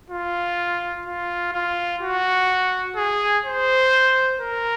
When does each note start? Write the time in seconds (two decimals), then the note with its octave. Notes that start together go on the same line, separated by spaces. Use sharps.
0.10 F4
1.06 F4
1.53 F4
2.01 F#4
2.96 G#4
3.45 C5
4.40 A#4